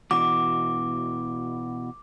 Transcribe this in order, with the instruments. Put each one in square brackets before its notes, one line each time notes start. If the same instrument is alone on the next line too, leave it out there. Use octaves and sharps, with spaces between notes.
[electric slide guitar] B2 E3 F#4 [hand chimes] D6